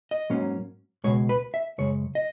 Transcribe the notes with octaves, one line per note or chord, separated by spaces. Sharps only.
D#5
G#2 F#3 A#3 C#4
C#2 B2 G#3 C#5
B4
E5
F#2 C#3 G#3 C#5
D#5